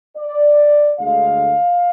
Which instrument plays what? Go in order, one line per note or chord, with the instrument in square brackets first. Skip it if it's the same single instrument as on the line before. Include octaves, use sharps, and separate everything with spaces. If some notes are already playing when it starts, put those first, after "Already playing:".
[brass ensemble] D5
D2 D3 G#3 F5